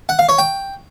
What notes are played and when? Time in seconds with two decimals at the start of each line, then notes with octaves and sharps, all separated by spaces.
0.09 F#5
0.19 F5
0.29 C#5
0.38 G5